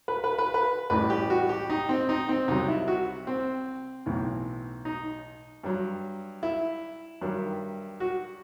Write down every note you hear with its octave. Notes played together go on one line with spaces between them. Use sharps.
B4
B4
B4
B4
A1 A2 E3 G3 B4
G4
F#4
G4
D#4
C4
D#4
C4
C2 C3 F#3 D#4
E4
F#4
C4
B1 A2 E3
D#4
G2 F#3
E4
G2 D#3 F#3
F#4